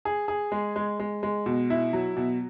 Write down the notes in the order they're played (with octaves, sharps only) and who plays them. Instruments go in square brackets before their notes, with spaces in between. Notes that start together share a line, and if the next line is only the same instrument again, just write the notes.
[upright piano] G#4
G#4
G#3
G#3
G#3
G#3
B2
E4
F#3
B2